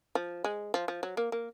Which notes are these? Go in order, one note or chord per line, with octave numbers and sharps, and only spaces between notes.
F3
G#3
F3
F3
F#3
A#3
A#3